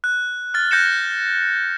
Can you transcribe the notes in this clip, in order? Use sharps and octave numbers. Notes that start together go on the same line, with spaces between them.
F#6
F6 A6
F#6 G6 A#6 C#7 E7